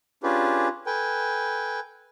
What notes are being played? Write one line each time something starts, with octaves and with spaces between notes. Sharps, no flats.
C#4 D4 F4 G4 G#4 B4
A4 B4 G5 G#5